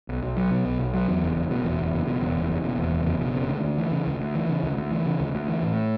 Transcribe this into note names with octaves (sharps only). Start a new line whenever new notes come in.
B1
B1
F#3
B2
B1
B1
F#3
E2
F#1
F#1
B2
E2
F#1
F#1
B2
E2
F#1
F#1
B2
E2
F#1
F#1
B2
C#3
D2
D2
E3
C#3
D2
D2
E3
C#3
D2
D2
E3
C#3
D2
D2
E3
A2